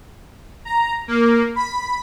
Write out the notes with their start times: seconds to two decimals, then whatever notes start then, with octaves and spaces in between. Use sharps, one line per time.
0.65 A#5
1.08 A#3
1.56 B5